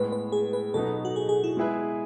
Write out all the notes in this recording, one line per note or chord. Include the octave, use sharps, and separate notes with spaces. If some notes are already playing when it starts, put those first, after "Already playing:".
Already playing: A2 G#3 B3 B4
B4
G#4
B4
B2 F#3 B3 D#4 A4
F#4
G#4
G#4
E4
G#3 B3 E4 G#4 B4